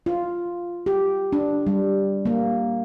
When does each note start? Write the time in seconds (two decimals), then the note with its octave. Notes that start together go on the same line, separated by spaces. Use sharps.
0.06 F4
0.86 G4
1.33 D4
1.67 G3
2.26 A#3